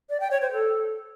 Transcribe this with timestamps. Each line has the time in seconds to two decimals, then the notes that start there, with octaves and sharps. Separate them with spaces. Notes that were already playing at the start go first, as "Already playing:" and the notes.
0.10 D5
0.20 G5
0.31 C#5
0.42 C5
0.52 A4